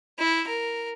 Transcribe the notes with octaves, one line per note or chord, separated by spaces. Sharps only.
E4
A#4